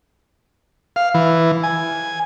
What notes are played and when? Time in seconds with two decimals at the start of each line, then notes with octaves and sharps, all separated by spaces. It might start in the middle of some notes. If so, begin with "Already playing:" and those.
0.96 F5
1.14 E3
1.63 G#5